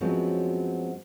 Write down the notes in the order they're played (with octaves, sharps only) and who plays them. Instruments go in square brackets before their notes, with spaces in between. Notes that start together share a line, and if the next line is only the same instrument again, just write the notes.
[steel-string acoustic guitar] F#2 F3 F#3 G#3 B3 C4